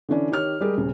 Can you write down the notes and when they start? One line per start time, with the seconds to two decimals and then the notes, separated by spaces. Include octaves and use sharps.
0.09 D3 E3 C#4 D4
0.31 D#3 G4 C#5 F6
0.61 G3 G#3 G4 G#4 A#4
0.77 D#1 C#3